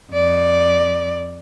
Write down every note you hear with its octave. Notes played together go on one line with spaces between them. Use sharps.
F2 D5